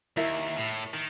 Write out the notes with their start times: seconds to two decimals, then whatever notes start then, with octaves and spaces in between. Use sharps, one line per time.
0.17 D#2 E4 A#4 E5
0.57 A2
0.94 D#3